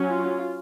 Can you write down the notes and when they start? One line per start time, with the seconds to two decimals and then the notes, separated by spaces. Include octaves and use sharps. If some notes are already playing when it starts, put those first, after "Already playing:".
Already playing: F#3 C#4
0.08 F4